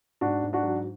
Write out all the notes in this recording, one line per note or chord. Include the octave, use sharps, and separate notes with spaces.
G#2 D4 F#4
G#2
D4 F#4
F#3